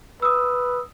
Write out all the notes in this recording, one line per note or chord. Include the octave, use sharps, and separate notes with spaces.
B4 D#6 E6